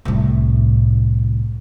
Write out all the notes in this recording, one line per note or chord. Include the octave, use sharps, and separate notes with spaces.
C2 A2